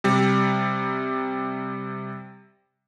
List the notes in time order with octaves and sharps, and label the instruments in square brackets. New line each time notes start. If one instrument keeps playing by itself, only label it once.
[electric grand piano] C3 G3